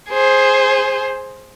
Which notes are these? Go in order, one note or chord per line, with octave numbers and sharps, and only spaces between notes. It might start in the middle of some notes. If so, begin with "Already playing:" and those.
G#4 C5